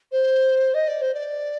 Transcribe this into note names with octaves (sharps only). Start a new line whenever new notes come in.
C5
D#5
D5
C5
D5